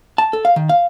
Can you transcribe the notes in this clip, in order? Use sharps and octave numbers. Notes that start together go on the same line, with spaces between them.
A5
A4
F5
D#3
F5